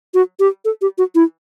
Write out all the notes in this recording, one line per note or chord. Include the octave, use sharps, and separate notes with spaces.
F#4
G4
A4
G4
F#4
E4